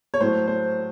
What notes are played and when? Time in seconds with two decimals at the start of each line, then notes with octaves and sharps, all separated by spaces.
0.14 C#5
0.20 A2 F#3 A3 C5
0.48 C5